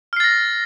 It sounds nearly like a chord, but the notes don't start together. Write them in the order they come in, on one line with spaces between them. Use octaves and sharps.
F6 C7 A6 A#6